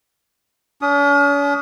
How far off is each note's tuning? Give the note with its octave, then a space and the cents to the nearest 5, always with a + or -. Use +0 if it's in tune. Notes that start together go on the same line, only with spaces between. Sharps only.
C#4 +45 D#6 +0